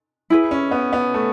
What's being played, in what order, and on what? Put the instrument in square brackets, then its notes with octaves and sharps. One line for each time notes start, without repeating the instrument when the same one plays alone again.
[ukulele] E4 G#4 B4
[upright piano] C#4
B3
B3
A3